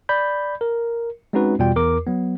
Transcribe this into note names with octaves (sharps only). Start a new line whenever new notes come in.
D5 B5 G6
A#4
G#3 C4 C#4 D#4 F#4 B4
E2 B2 G3 F4 D5 G5
E2 A#4 D6
F#3 B3